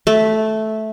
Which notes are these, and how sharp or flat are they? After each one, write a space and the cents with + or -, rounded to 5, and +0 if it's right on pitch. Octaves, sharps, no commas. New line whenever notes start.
A3 -10